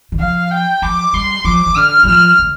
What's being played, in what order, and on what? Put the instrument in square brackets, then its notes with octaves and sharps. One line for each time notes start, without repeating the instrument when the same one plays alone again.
[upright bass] D3
[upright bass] F3 [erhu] F5
[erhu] G5
[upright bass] F3 [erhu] D6
[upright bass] G3 [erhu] C6
[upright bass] F3 [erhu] D6
[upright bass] F3
[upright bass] D3 [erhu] F6
[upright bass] G3
[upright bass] F3 [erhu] F6
[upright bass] D3